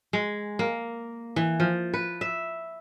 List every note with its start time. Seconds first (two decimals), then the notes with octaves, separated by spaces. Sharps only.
0.13 G#3
0.59 A#3
1.36 E3
1.60 F3
1.94 B4
2.21 E5